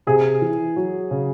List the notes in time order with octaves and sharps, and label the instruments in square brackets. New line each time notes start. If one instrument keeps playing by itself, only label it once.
[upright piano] C3 [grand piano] G#4
[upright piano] E3
F#3
C#3